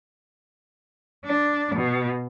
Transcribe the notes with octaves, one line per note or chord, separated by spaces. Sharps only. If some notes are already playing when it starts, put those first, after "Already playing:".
D4
B2